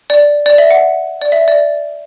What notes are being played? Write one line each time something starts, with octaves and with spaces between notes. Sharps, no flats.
D5
D5
E5
F#5
D5
E5
D5